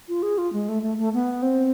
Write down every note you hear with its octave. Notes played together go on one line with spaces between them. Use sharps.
F4
G#4
F4
G#3
A3
A3
A3
B3
C4